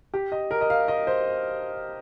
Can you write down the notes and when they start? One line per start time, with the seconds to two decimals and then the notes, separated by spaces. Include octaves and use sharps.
0.14 G4
0.32 D#5
0.51 A#4
0.61 D#5
0.70 F5
0.88 D#5
1.07 C5